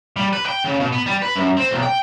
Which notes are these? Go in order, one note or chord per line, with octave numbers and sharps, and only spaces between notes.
G3
B4
G5
C#3
B2
B3
G3
B4
F#2
C4
B1
G5